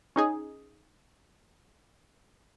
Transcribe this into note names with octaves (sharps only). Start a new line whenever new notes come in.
C#4 D#4 G#4